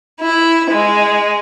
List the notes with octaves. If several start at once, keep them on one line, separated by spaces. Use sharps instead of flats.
E4
G#3